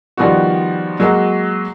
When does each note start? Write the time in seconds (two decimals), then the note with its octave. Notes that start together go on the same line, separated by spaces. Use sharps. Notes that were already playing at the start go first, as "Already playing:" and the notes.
0.17 D#3 F3 G3 B3 F#4
1.00 F#3 G#3 A#3 F#4